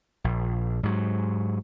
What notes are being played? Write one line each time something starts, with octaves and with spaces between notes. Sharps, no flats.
A#1
G#2 F#3